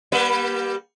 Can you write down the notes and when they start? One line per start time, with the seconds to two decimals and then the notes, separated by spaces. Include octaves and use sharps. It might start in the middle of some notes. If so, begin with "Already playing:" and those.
0.12 G3 A#3 B4